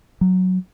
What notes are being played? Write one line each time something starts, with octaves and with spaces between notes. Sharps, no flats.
F#3